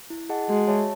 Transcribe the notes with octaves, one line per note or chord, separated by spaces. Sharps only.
E4
G#4 D#5 F#5 A5
G#3 F#4
C#5 E5 A5